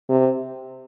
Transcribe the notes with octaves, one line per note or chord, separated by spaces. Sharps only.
C3